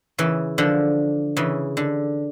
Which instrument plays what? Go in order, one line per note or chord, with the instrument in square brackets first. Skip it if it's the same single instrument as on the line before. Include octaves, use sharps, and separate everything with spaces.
[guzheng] C#3 E3
D3 F3
C#3 E3
D3